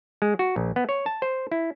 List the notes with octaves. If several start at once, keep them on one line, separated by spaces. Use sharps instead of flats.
G#3
F#4
A#1
B3
C#5
A5
C5
E4